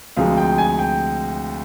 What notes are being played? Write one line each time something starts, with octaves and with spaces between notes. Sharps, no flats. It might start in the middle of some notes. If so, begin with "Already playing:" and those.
D2 C3 F3 G#3 F5
G5
G#5
G5